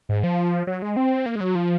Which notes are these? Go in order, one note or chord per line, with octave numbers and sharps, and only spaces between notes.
G#2
F3
F#3
G#3
C4
A#3
G#3
F#3
F3